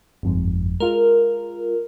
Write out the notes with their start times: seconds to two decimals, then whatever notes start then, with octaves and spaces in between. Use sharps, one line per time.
0.23 G1 F2 G#2
0.80 G#3 F4 A#4